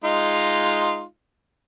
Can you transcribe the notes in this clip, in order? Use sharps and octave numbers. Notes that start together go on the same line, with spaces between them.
G#3 D#4 F4